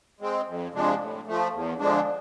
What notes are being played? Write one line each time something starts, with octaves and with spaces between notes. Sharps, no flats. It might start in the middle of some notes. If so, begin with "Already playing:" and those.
G#3 C4
F2
C3 F3 G#3 D4
A2
F3 A3
E2
D3 F3 G#3 D4